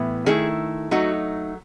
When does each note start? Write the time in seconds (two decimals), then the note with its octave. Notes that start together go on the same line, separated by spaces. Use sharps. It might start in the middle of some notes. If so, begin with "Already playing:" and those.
Already playing: A2 E3 B3
0.26 D#3 A3 E4 G#4
0.91 F#3 A3 D#4 F#4